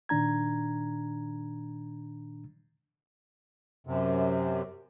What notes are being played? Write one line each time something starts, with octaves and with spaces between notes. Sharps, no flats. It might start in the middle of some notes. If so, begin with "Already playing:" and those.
A#2 D#3 D4 A#5 G#6
F#2 C3